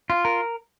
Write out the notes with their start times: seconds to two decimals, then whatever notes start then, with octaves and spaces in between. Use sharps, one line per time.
0.10 F4
0.25 A#4